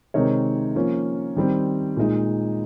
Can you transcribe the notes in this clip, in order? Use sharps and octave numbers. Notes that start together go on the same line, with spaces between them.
C3 D#3 G#3 C4 D#4 A#4 C#5
F3 A#3 C#4
D#3 G3 C4
A#2 G#3 D#4